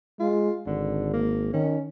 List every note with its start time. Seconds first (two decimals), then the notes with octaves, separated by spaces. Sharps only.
0.20 G#3 F4
0.67 G#1 D3
1.14 A#3
1.54 D#3 C#4